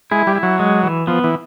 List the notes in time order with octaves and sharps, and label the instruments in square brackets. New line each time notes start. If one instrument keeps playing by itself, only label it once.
[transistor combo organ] G#3 [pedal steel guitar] E4
[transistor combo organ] G3
[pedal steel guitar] E4
[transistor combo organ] F#3
[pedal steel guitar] G#3
E3
[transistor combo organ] F3 [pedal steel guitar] B3
[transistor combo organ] E3